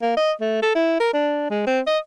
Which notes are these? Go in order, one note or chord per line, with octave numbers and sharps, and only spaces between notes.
A#3
D#5
A3
A4
E4
A#4
D4
G#3
C4
D#5